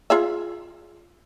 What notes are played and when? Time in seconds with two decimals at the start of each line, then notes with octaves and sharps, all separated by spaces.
0.10 F4 G#4 E5